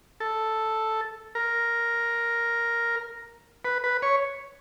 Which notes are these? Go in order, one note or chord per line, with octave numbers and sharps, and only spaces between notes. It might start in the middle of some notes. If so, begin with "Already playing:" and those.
A4
A#4
B4
B4
C#5